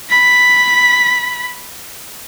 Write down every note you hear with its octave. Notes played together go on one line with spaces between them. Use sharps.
B5 B6